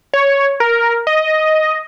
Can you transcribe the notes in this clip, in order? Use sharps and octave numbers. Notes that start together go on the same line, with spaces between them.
C#5
A#4
D#5